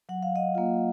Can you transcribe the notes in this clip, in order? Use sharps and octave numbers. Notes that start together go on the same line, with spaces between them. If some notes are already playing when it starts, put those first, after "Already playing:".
F#3 F#5
F5
D#5 F#5
A#3 F4